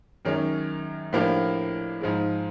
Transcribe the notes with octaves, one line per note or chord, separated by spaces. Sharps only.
F#2 D#3 G#3 C#4
A2 F3 A#3 D4 G4
G#2 F3 G#3